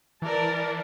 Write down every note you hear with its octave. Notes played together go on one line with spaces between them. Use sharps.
E3 A#4 D5 A5